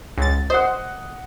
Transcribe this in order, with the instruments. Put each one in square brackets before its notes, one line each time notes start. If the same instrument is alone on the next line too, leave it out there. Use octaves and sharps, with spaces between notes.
[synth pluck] C#2 A6
[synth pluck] C5 [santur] D#5 F#5